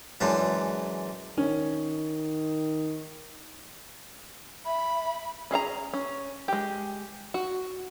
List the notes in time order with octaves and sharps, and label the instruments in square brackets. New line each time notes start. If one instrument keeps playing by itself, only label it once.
[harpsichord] F#2 E3 G#3 D4
[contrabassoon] D#3 [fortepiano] C#4
[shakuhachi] E5 [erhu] B5
[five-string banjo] C#4 G#4 E5 A#5
C#4
G#3 G4
F#4